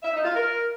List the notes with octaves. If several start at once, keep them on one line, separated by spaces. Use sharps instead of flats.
E5
D#4
F4
A#4